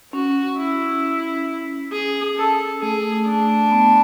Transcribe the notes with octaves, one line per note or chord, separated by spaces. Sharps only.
C#4 F#4
E4
G#4
A4
A3 G#4
D4
B3